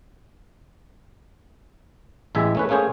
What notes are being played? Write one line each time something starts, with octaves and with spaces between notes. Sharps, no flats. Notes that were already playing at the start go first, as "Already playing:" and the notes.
A1 E2 G#3 E5 G#5
A3 C#4 B4
A3 A#3 C#4 G#4 C5